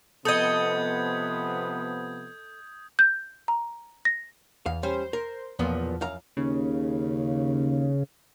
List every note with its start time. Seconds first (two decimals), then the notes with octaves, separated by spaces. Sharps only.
0.25 C3 F3 B3 A4 D#5 D#6 G6 G#6
2.99 G6
3.48 A#5
4.05 A#6
4.66 E2 F5
4.83 G3 C#4 C5
5.13 A#4
5.59 B1 E2 A#2 F3 B3
6.01 F#2 F5 A#5
6.37 D#2 C#3